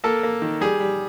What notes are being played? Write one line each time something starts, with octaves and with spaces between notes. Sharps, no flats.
A#3 A4
A#3
D#3
G3 G#4
G3